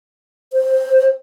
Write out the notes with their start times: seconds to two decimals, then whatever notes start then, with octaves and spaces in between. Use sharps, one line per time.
0.53 C5